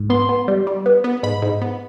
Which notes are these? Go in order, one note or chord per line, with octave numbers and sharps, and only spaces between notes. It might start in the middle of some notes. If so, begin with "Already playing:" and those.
Already playing: G#2
B3 C6
B3
G3
G3
B3
B3
G#2 B5
G#2
B3